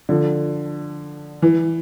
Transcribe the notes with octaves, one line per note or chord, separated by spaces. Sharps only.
D3 F3
E3